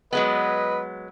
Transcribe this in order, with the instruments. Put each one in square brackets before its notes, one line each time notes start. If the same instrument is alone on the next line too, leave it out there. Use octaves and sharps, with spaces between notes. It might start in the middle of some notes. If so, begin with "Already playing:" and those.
[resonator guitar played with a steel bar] F#3 G#3 B3 [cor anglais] B4 [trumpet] D#5